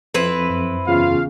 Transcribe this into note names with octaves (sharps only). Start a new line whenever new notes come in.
F2 C4 E4 B4
F#2
E2 C#3 F4 F5